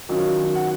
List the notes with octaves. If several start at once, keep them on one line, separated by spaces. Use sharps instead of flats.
D#3 F#3 C#4 F4
F#5